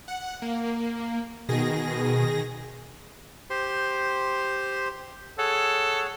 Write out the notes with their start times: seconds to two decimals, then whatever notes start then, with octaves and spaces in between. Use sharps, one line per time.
0.08 F#5
0.42 A#3
1.49 B2 D#3 G#4 A#6
3.50 G4 C5 C6
5.38 G#4 A4 C#5 F#5